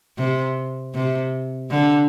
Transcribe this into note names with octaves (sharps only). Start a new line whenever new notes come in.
C3
C3
D3